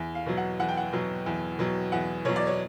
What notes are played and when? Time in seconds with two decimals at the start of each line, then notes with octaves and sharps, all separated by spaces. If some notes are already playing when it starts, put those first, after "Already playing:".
Already playing: E2
0.15 F5
0.26 B2 F#3
0.37 F#5
0.60 E2 F#5
0.69 G5
0.77 F#5
0.93 B2 F#3
1.26 E2
1.59 B2 F#3
1.92 E2 F#5
2.25 B2 F#3 C#5
2.36 D5
2.47 C#5